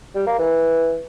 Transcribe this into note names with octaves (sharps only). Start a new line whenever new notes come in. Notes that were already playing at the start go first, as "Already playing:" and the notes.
G3
A#3
E3